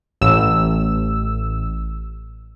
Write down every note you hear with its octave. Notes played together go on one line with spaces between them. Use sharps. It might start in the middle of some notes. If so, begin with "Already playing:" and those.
A1 E6